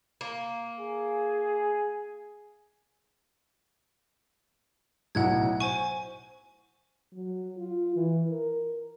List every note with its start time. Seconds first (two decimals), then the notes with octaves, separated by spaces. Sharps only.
0.21 A#3
0.80 G#4
5.15 B1 A2 F#3 F#5 F#6 G#6
5.60 C5 G#5 C#6 D#7
7.13 F#3
7.57 F4
7.96 E3
8.31 A#4